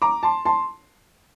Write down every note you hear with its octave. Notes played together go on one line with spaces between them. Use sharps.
A#5 D6
A5 C6
A5 C6